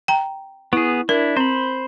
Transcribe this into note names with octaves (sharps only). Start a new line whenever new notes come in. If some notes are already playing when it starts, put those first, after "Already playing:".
G5 A#5
B3 E4 G#4
D4 E4 A#4
C4 C5 B5